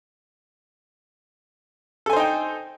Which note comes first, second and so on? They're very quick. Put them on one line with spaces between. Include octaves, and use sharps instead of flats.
A4 G#5 C5 D#4 G5